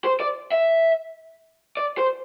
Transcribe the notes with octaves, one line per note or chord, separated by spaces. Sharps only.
C5
D5
E5
D5
C5